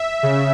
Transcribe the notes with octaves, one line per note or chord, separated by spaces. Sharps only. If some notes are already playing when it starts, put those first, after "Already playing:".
Already playing: E5
C#3